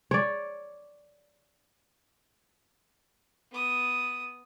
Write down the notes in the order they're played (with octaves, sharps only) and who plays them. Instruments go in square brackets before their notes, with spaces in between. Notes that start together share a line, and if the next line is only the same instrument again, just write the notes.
[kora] C#5 D5
[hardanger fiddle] B3 D#6